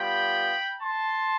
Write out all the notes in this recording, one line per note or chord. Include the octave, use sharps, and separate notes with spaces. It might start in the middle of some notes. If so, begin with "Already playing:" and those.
Already playing: G3 B3 F4 G5 B5
A5 C6